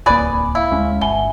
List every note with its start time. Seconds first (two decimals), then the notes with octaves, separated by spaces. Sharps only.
0.06 D1 C2 A#3 G#4 B4 D5 B5 D#6
0.55 E4 F5
0.71 D2 G#3 C#4
1.01 G1 B2 E5 G#5 G7